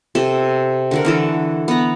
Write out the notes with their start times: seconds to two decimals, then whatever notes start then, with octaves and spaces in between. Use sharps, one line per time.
0.15 C3 A4
0.91 D3 F#4 A#4
1.05 D3 E3 A4
1.68 B3 A#5